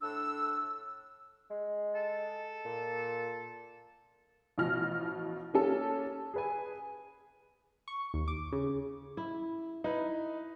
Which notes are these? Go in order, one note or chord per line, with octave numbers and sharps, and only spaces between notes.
A2 D4 E6
G#3
A4
A#2
A1 B2 F3 F6 A#6
A#3 C#4 A4
G#4 B4 G#5
C#6
D#2
D6
C#3
E4
D#4 E4 B4